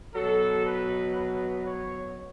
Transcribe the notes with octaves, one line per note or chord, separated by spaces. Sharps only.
B2 F#3 A4
B4
B4
C#5